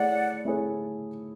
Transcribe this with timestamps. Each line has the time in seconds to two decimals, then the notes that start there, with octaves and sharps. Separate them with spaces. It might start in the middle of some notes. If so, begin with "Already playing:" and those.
Already playing: A3 E4 G#4 C#5 D5 F#5
0.45 A3 E4 G#4 C#5